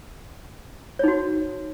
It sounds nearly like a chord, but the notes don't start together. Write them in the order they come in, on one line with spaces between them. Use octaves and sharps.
C#5 D#4 F#4